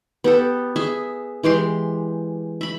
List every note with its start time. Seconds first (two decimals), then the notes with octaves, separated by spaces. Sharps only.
0.24 B3 G4 A4
0.76 G#4 E5
1.43 E3 G#3 G4 C6
2.61 E5 B5